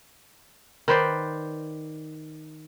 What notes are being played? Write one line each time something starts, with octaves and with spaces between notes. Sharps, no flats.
D#3 B4 C5 D5